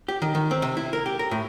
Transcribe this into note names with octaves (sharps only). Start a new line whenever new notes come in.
G4
D#3
D#3
C4
C3
E4
A#4
G4
A#4
A2